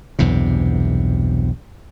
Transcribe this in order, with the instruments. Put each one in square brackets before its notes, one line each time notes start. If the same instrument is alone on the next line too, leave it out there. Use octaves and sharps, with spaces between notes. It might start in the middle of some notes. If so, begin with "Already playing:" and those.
[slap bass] B1 E2 G2 C3